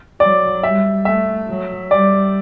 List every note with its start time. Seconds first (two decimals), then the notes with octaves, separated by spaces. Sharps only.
0.20 F#3 D5
0.63 G3 E5
1.05 A3 E5
1.48 F#3
1.91 G3 D5